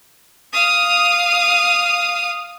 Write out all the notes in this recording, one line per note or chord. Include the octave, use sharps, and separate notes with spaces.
F5 D#6